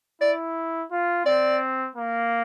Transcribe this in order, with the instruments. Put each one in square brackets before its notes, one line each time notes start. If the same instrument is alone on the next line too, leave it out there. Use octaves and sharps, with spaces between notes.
[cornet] E4 [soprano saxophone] D5
[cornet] F4
[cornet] C4 [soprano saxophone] D5
[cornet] A#3